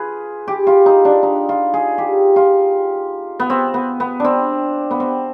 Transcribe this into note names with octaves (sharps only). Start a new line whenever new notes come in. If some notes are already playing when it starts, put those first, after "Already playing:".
Already playing: F4 G#4 B4
G4
F4
D#4
D4
D#4
F4
G#4
G4
F4
B3
C4
B3
B3
C4 D4
B3
C4